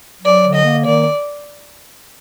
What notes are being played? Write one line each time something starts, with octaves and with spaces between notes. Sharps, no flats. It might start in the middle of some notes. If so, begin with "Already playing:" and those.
F#3 D5
D3
D#5
A#3
D#3 D5